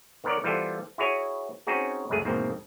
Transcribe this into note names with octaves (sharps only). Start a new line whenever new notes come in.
D#3 B3 A#4 C#5 D5
E3 G3 B3 F4 A4 C5
E4 F#4 G#4 C#5 G#5
C4 C#4 D#4 F#4 G#4
C#2 F#2 G#3 A3 G#4
E2 G#2 B2 D#3 A#3 C4